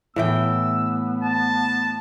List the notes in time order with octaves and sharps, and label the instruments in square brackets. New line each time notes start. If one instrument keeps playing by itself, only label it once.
[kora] A2 E3 G5 [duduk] B3 [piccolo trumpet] E6
[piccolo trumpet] A5